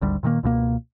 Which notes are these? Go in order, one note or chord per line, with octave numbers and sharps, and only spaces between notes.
G#1 D2 G3
A#2 D#3 E3 A#3
C#2 B2 G#3 A#3